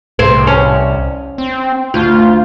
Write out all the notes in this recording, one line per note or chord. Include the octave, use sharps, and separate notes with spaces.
C2 C4
C#4
C4
D2 F4